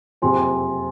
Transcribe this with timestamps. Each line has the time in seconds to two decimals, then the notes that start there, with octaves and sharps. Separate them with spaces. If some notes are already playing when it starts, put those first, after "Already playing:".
0.22 F#1 F2 C3 G#5 C6